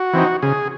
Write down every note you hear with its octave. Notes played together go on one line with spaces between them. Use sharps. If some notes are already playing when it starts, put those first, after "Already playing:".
Already playing: F#4
E3 C4 D#4
C#3 G#4